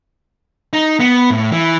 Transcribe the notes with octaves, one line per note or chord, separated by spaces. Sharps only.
D#4
B3
A2
E3